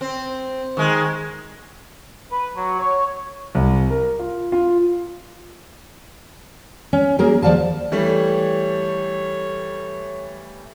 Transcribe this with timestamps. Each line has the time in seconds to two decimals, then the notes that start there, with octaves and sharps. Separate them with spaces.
0.01 C4
0.77 D#3 G#3
2.31 B4
2.56 F#3
2.79 C#5
3.55 C2
3.90 A#4
4.19 F4
4.52 F4
6.93 C#4
7.19 F#3 A#3 G#4 A#4
7.42 D#2 F3 D5 F5 A5
7.92 E3 G3 A3 C#5